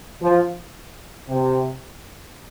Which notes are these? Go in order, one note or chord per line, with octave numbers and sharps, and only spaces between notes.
F3
C3